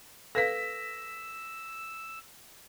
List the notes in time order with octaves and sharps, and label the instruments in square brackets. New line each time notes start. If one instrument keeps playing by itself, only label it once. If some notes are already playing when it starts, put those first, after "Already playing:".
[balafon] A4 B4 F5 [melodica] E6 [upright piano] A#6 B6